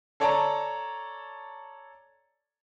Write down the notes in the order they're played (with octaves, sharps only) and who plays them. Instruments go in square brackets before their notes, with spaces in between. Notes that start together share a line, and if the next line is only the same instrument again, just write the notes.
[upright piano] A4 C#5 D5 A5 A#5